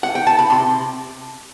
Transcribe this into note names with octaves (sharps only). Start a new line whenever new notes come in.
F#5
G5
A5
B5
C3 C6